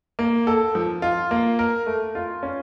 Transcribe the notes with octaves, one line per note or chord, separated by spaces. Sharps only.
A#3
A4
F3
F4
A#3
A#4
A3
F4
C#4